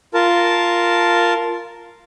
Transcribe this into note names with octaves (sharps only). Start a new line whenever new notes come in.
F4 A#4 A5